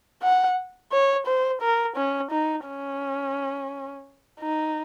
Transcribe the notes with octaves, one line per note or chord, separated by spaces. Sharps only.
F#5
C#5
C5
A#4
C#4
D#4
C#4
D#4